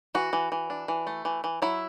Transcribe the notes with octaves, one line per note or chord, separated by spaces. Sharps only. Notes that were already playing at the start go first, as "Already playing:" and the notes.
E3 F#4
E3
E3
D4
E3
A3
E3
E3
F#3 E4